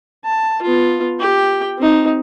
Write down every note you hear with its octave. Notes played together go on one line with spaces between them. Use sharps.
A5
B3 F4
G4 G5
C4 D#4